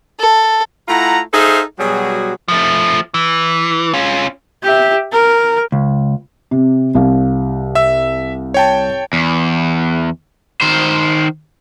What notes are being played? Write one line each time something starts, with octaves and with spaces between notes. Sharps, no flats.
A4
A3 E4 F4 F#5 A#5
D#4 G#4 A4 C5 E5 F5
B2 F#3 G3 F#4 G#4
F3 A3
E3
C#4 F4
G4 E5
A#4
C#2
C3
C2 F5
E5 E6
C#5 G5 A5
E2
D#3 C5